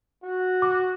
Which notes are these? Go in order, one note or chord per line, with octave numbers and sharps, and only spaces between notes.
F#4
D6